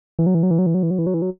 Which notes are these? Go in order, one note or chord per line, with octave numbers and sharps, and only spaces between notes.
E3
F#3
E3
F#3
E3
F#3
E3
F#3
E3
F#3
E3
F#3
E3
F#3